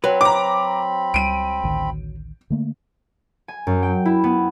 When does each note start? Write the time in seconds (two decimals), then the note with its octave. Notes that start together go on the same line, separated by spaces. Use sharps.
0.04 F#3 C4 B4 B5
0.21 A#5 D6
1.14 C#2 G3 D7 D#7
1.64 A1 D2 D#3
2.50 D3 A3 A#3
3.48 G#5
3.67 F#2
3.83 G5
4.05 E4
4.24 B3